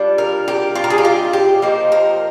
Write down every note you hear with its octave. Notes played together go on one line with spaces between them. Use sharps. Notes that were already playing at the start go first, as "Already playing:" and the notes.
Already playing: G3 D4 F4
A#4
G4
F4
A#4
G#4
G4
F4
G4
F3 A#3 D#4 C5
A#4